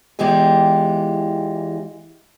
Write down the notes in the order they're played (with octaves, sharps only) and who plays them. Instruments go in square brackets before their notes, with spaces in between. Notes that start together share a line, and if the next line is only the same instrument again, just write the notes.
[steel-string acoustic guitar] E2 E3 G#3 F4 G4